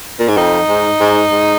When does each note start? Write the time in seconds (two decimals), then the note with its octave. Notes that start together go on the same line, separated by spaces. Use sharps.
0.19 A#2
0.28 G#2
0.37 F2 D#4
0.69 G#2
1.01 G#2
1.32 G#2